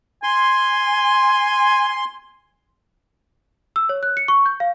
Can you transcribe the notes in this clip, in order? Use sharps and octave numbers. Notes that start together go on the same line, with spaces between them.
G#5 C6
E6
C#5
F#6
C#7
C#6
G6
F5